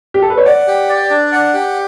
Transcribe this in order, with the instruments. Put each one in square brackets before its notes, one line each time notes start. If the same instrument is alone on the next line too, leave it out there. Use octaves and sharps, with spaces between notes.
[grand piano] G4
A4
B4
C#5
[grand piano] D5 [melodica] F#5
[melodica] G4
D5
D4
F#5
G4